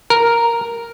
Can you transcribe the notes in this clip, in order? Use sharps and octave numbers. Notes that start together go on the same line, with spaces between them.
A#4